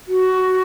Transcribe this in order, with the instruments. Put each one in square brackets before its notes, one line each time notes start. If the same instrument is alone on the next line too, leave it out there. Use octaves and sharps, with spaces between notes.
[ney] F#4